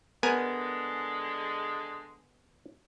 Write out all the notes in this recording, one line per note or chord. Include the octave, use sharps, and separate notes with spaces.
D3 G#3 B3 A#4 G#5